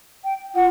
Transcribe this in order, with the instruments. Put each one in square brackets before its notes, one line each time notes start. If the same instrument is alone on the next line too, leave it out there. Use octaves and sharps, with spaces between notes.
[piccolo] G5
[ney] F4 [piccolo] F#5